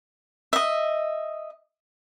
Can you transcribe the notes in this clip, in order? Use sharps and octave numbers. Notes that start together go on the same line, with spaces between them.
D#5 E5